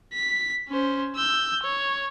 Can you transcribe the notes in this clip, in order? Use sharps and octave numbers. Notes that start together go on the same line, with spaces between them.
B6
C#4 C5
E6 G6
C#5